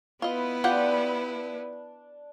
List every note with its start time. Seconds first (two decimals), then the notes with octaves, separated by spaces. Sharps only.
0.22 B3 E4 F4 B4 D#5
0.64 D4 F4 G4 F#5